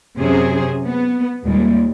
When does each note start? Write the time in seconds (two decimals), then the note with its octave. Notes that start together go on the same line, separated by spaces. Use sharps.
0.19 F#2 C3 F#3 C#4 G#4 C5
0.88 B3
1.44 D#2 A#2 G3 G#3